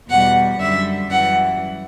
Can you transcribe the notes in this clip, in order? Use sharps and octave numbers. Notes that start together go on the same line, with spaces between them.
E2 B2 G3 F#5
F#2 D3 G3 E5
F#2 E3 G3 F#5